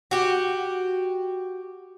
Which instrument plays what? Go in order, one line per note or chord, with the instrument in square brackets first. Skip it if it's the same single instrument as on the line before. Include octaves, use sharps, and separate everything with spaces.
[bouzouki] F#4 G4